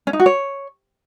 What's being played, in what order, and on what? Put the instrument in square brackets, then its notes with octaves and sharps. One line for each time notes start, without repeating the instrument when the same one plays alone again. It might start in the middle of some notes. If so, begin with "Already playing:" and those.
[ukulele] C#4
D#4
F#4
C#5